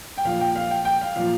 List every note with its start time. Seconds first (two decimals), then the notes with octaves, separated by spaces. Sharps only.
0.18 G5
0.25 A#2 F3 F5
0.41 G5
0.56 F5
0.71 G5
0.85 G5
1.01 F5
1.16 A#2 F3 F5